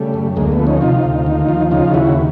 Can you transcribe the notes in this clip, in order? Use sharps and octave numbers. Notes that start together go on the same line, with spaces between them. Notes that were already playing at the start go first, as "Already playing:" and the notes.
Already playing: C#3 G3 A3
F#2
D2 G#3 A#3
A3 B3
F3
C#4 D#4
C3 D#4 F4
D2
D#2
F3
C#3 D#4 F4
D#2 E4 F#4